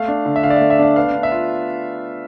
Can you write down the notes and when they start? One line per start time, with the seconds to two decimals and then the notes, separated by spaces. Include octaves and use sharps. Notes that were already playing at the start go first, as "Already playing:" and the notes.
Already playing: A3 F5
0.08 D4
0.26 D3
0.36 E5
0.43 D3 F5
0.50 D5
0.56 A3 E5
0.70 E5
0.79 D4 F5
0.96 B3 F5
1.14 D4
1.23 E5
1.32 F4